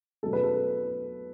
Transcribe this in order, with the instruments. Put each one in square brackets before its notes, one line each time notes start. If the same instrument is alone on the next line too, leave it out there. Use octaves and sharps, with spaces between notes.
[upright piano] B2 F#3 A3 A4
B4
A4